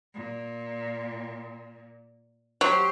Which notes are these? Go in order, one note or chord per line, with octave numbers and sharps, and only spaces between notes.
A#2
F#3 G4 C5